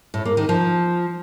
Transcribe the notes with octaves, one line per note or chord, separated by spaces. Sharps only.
A2
A#3
D#3
F3